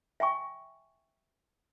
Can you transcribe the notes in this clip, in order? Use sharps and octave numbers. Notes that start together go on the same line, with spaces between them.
E5 G5 G#5 C#6